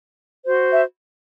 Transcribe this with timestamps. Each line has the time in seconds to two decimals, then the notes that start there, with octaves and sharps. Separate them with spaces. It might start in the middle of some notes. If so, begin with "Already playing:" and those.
0.45 F#4 C5
0.72 E5